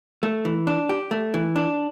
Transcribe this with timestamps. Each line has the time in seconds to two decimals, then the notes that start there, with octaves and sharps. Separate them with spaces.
0.23 A3
0.45 E3
0.67 D4
0.89 G4
1.11 A3
1.34 E3
1.56 D4